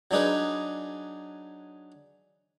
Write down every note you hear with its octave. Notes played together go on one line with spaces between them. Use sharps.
F#3 D4 D#4 G#4 B4